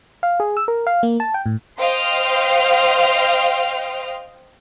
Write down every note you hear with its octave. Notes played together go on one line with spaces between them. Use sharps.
F5
G#4
E6
A#4
F5
A#3
A5
G5
A2
C5 D#5 F5 G5 C6 F6